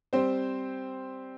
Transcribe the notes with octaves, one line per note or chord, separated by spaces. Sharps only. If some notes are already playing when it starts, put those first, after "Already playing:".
G3 C4 C5